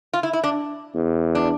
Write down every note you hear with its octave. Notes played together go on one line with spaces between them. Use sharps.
F4
E4
E4
D4
E2
D4